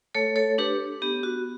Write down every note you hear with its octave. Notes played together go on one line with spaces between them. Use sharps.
A3 A4 C#5
A4 C#5
D4 G4 B4
B3 G4
F#4